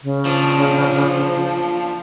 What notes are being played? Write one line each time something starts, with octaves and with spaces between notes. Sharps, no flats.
C#3
F3 D4